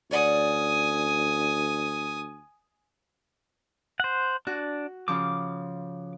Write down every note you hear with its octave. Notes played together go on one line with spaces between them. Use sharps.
D2 C#4 D5 F#5 G#5 D#6
C5 F#5
D4 F#4
C#3 F3 D6